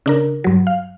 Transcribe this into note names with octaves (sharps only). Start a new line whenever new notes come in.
C#3 D4 A#4
G2 F#3
F5